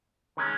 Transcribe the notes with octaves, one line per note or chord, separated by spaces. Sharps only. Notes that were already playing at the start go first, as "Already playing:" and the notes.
D#3 G#3 C#4